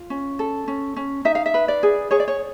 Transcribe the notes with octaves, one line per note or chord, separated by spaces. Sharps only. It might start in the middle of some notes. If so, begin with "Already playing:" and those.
Already playing: F4
C#4
A4
C#4
C#4
D#4 E5
F5
E5
B4
D5
G#4
G#4 C#5
D5
C#5